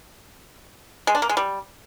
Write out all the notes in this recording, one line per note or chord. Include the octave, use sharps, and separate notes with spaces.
G#3
D4
A#3
G#3
G3